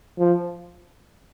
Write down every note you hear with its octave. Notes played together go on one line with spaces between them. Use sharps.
F3